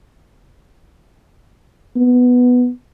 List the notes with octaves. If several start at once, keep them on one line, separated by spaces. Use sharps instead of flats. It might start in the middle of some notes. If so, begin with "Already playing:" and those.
B3